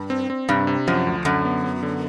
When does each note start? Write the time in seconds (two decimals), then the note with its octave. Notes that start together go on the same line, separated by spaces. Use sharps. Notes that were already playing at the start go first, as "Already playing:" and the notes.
Already playing: G2
0.10 C4
0.30 C4
0.49 G2 C3
0.67 C3
0.88 F#2 F3
1.07 D2
1.25 F#2 D3
1.45 B3
1.64 B3
1.83 D3